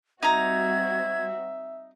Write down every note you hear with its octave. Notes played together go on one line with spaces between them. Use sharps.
G3 C4 D#4 F#4 E5 A#5 G#6